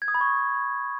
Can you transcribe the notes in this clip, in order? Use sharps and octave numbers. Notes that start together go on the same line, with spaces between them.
G#6
D#6
B5
C#6